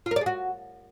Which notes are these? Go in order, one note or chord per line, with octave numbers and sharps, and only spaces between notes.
F4
A#4
D5
G#4
F#4